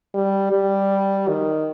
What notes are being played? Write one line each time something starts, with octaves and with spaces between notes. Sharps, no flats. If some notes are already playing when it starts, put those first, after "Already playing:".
G3
G3
D#3